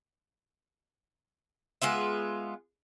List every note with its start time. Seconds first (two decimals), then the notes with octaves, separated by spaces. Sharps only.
1.82 G#3 B3 F4 E5